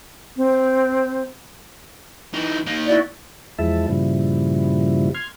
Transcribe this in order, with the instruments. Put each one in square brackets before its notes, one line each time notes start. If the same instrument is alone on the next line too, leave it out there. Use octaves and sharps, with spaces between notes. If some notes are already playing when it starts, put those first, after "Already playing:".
[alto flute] C4
[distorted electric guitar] E3 D#4
A#3 D#4
[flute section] E4 F#4 D5
[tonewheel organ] E2 F3 G#3 E4 E5 A5
G2 A#2 C#3 F3 G3 E4
C6 F6 G#6